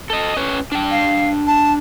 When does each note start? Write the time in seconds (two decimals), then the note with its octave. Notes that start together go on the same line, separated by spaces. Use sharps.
0.10 A4 D#5
0.37 C#4 B4 C#5
0.72 D4 G5
0.91 F5
1.47 A5